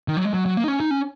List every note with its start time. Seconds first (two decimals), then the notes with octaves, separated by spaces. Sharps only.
0.08 D#3
0.17 F#3
0.25 G#3
0.33 F#3
0.46 F#3
0.57 A#3
0.64 D#4
0.68 C#4
0.80 D#4
0.91 C#4